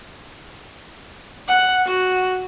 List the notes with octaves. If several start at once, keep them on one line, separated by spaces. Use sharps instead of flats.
F#5
F#4